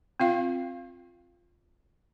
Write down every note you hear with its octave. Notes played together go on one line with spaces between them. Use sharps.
C4 F4 F5